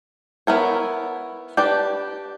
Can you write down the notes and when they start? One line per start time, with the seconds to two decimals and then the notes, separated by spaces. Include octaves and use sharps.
0.47 B3 E4 A#4 C#5
1.57 D4 G4 B4 D5